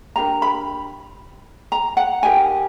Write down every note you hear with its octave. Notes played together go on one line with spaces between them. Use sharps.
D4 G4 A#4 A#5
B5
A#5
F#5
D#4 G4 A#4 G#5